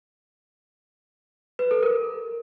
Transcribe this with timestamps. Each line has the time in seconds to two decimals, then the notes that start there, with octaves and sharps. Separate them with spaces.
1.59 B4
1.71 A4
1.83 A#4